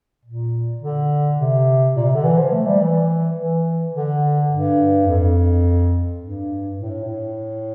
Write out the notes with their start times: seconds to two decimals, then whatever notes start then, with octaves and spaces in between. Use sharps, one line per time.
0.25 A#2
0.82 D3
1.38 C3
1.96 A#2
2.05 C3
2.15 D3
2.24 E3
2.38 F3
2.52 A3
2.66 G3
2.80 E3
3.36 E3
3.94 D3
4.51 G2
5.06 F2
6.20 G2
6.76 A2
7.04 A2